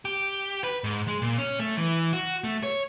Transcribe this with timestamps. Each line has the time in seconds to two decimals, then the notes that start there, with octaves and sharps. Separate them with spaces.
0.05 G4
0.64 B4
0.84 G#2
1.08 G#3
1.22 A#2
1.38 C#4
1.59 A3
1.77 E3
2.13 F#4
2.44 A3
2.63 C#5